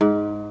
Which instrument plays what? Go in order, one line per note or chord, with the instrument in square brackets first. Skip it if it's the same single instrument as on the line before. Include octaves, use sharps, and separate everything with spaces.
[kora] G#2